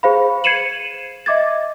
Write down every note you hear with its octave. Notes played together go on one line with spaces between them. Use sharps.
G#4 C5 F5 B5
G#6 C7 C#7 D#7 E7 F#7
D#5 E5 D6 G#6 A6